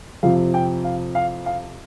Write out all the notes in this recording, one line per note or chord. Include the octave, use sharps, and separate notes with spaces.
F2 C3 F3 F5
G5
F5
F5
F5